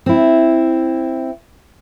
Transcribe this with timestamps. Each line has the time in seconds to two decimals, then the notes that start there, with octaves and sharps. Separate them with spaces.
0.06 C4 E4